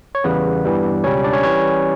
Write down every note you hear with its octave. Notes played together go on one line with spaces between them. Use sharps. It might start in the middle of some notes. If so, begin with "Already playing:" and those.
C#5
E2 C#3 E3 G3 B3 B4
G2 E3 G3
C#2 B2 G3 C#4 C#5
D4 D5
C#4 C#5
E3 G3 C#4 C#5